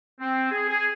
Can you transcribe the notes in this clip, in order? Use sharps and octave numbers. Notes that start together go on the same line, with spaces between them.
C4
G#4
G#4